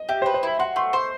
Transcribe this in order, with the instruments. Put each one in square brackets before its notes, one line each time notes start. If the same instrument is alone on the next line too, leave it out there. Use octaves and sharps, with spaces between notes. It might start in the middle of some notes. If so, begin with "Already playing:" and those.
Already playing: [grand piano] D#5
[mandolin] G4 [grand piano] E5
[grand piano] C5
[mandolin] B4
[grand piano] C5
[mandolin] E4 [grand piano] B5
[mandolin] F#4 [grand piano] C6
[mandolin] A3 [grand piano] C6
[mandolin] C5 [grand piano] C6